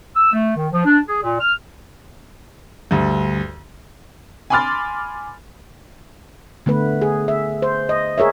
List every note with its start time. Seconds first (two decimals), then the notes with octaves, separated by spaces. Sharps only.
0.15 E6
0.32 A3
0.56 D#3
0.72 F3
0.85 D4
1.06 G#4
1.22 A#2
1.40 F6
2.91 D2 G2
4.50 G#5 B5 C6 D6 F6 A6
6.66 D3 A3 B3 B4
7.02 G#4
7.28 E5
7.62 C5
7.89 D#5
8.18 G#4 A#4 C#5 E5